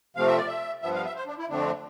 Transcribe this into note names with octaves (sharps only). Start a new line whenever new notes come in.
C3 F3 A3 C4 F5
E5
D5
E5
G2 F3 B3 E5
F5
E5
C5
D4
E4
F2 D3 A3 C4 D4